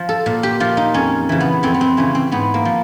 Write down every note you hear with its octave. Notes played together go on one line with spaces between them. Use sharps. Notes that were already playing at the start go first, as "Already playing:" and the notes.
Already playing: F3
A4
A#2
G4
F3 F4
D#4
F2 C#4
C#3 E3
B3
F2 C4
B3
C4
C#3 E3 C#4
C4
G#2 B3
A#3
F3